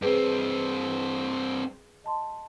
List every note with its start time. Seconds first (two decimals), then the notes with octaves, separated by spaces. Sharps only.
0.02 G2 C4 G#4 B4
2.04 D#5 A5 C6